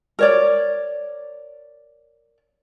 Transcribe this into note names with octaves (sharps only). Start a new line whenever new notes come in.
A#4 C#5 D5